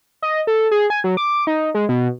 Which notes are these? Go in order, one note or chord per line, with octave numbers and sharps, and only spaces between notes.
D#5
A4
G#4
G#5
F#3
D6
D#4
G#3
B2